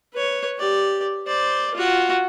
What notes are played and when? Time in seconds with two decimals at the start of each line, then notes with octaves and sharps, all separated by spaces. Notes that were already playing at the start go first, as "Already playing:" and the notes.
0.13 B4 C#5
0.58 G4 D5
1.27 C5 D5
1.75 F4 F#4